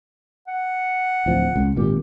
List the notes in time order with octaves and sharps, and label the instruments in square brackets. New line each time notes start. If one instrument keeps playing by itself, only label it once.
[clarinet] F#5
[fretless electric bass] D1 F3
C#2
[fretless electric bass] G#1 A#2 [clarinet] G4